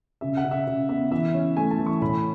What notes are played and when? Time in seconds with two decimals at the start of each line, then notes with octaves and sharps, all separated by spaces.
0.21 C#3 E5
0.37 F#5
0.44 C#3
0.51 E5
0.67 C#3
0.89 B3 E5
1.11 E3 E5
1.34 C#4
1.57 A3 G#5
1.71 A5
1.79 E3
1.86 C#6
2.01 A2 B5